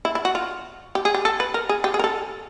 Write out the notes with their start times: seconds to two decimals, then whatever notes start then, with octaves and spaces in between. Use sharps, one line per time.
0.05 E4
0.15 E4
0.25 F#4
0.35 F4
0.95 G4
1.05 G#4
1.14 G4
1.25 A4
1.40 B4
1.54 A#4
1.69 G#4
1.84 G4
1.94 G#4
1.99 A#4
2.04 A4